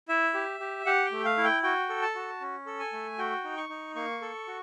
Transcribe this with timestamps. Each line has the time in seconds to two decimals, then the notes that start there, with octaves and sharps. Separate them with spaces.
0.08 E4 E5
0.34 G4
0.60 G4
0.86 G4 F#5
1.05 G5
1.12 A3
1.25 F5
1.38 E4
1.44 G5
1.63 F#4 G5
1.89 A4
2.02 A5
2.15 F#4
2.41 C#4
2.66 A4
2.79 G#5
2.93 A3
3.18 F#4 G5
3.44 D#4
3.57 C#6
3.69 D#4
3.95 A#3 C#6
4.22 A4
4.47 F#4